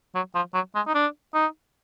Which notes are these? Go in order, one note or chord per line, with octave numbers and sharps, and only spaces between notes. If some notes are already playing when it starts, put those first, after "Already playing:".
F#3
F3
F#3
G#3
D#4
D4
D#4